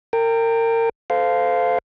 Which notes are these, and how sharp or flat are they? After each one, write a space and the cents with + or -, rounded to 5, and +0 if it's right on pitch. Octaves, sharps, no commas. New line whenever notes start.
A#4 -30 G5 +15
A4 -5 C5 -25 F5 +0